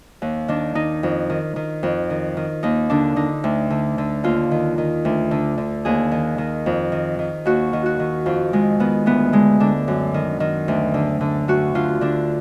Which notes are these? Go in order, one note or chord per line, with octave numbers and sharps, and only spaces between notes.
D#2
D#3 D4
D#3 D#4
F2
D#3
D#3
F2
D#3
D#3
D#2 D#4
D3 D4
D3 D#4
D2
D3
D3
D#2 F4
D#3
D#3
D2
D3
D3
D#2 G#4
D#3
D#3
F2
D#3
D#3
D#2 F#4
D#3
F#4
D#3
F2 F4
D#3 G#3
D#3 B3
D2 B3
D3 G#3
D3 D4
F#2
D#3
D#3
D2
D3
D3
D2 F#4
D3 F4
D3 D4